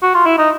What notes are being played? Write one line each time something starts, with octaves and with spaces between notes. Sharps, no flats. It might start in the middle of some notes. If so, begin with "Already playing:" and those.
F#4
F4
E4
D#4